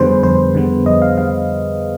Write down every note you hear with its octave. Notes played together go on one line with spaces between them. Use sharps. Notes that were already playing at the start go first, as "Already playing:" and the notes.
Already playing: F2 D3 G3 B3 G#4 B4 C5
F2 C5
D3 G3 B3
F2 D#5
F5
D3 G3 F5